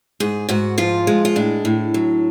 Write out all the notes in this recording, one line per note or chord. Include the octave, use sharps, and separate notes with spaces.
G#2 G#4
G#2 F#4
F3 F4
G#3
F4
A2 D4
A2
F#3